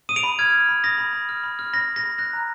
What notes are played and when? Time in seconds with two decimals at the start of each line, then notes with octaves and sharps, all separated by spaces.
0.09 D#6 D#7
0.16 D7 F7
0.24 B5
0.39 F6 G#6
0.53 F6
0.69 B5
0.84 D#6 A#6
0.98 B5
1.13 B5
1.29 F6
1.44 B5
1.59 F6
1.73 B5 A#6
1.88 B5
1.96 A#6
2.03 B5
2.18 F#6 A#6
2.33 A#5